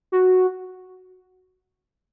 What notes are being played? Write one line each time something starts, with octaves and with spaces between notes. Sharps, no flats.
F#4